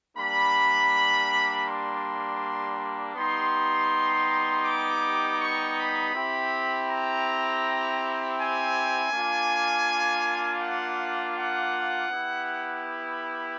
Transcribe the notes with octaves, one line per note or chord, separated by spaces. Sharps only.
G3 A#3 D4 B5
C6
G3 B3 D#4 G4 C6
D6
C#6
B5
C4 E4 G4
A#5
G#5
A#3 D4 F4
F#5
F#5
B3 E4 G4